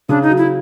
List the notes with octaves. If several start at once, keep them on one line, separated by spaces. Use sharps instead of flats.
C#3 D4
D#4
F#3
E4